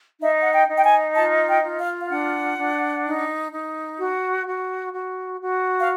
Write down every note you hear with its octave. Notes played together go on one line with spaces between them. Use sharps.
D#4 E5
F#5
G5
D#4
G5
G#5
F4 A5
G5
F4
F5
F5
D4 F#5
D4
D#4
D#4
F#4
F#4
F#4
F#4
F5